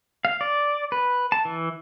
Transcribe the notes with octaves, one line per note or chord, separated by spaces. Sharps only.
F5
D5
B4
A5
E3